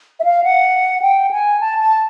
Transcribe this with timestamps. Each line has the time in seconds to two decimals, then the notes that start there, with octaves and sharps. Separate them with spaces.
0.20 E5
0.24 F5
0.44 F#5
1.02 G5
1.31 G#5
1.60 A5
1.79 A5